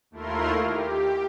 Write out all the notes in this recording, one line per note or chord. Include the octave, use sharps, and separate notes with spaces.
D#2 A3 E4 F4 A#4 C6
G4